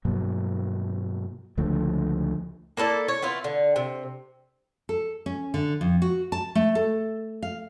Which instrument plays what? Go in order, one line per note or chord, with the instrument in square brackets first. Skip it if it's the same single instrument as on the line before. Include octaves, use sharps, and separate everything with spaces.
[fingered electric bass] G2 B2 F#3 A#3
C#2 D3 F3 A3
[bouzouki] A#3 E4 A4 D5
C#5
B3 E4 F4
D3
C3
[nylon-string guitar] A4
C#4
D3
F2
F#4
A5
A3
A4
F5